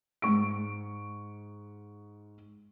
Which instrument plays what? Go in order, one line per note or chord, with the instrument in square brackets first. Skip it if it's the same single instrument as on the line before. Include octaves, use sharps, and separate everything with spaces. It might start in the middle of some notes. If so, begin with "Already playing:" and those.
[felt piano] G#2 C#6 D7